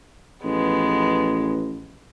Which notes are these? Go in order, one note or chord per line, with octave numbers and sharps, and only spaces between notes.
A1 F3 G#3 B3